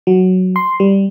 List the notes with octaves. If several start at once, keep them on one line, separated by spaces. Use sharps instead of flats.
F#3
C6
G3